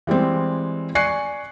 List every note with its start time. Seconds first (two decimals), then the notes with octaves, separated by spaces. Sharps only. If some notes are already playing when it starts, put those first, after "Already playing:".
0.07 E3 G3 G#3 C4
0.95 D5 G#5 C#6 F#6 C7 C#7